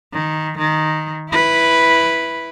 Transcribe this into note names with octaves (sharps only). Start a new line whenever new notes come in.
D#3
D#3
E4 B4